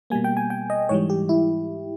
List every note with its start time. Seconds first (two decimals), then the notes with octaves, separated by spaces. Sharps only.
0.10 B2 G3 A#3 G#5
0.24 G5
0.37 G#5
0.50 G5
0.70 D#5
0.89 G#2 E3 G3 C#5
1.10 G4
1.29 E4